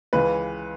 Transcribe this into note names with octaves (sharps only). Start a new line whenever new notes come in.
C#2 C#3 E3 B4